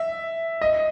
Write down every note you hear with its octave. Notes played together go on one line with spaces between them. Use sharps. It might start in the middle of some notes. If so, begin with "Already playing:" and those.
Already playing: E5
D#5